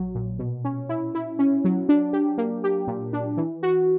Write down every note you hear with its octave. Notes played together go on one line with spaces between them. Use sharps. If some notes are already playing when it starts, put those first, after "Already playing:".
Already playing: A#1 F#3
A#2
B2
C#4
E4
E4
C#4
F#3
D4
G4
A#3
G4
A#2
D4
E3
F#4